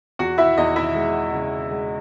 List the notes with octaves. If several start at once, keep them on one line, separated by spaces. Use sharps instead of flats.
E2 F#4 F#5
E4 E5
E2 D#4 D#5
E4 E5
G#3
C#3
G#3